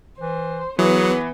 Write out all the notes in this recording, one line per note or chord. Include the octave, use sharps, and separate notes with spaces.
E3 C5
E3 F#3 B3 G#4